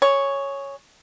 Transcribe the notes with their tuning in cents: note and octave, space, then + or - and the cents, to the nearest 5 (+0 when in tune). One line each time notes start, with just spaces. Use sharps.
G#4 +0 C#5 +0